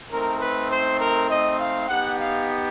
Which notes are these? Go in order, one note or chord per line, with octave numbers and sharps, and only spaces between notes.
A3 C4 D#4 A#4
B4
C5
A#4
D#5
F5
B3 D#4 G4 F#5
F5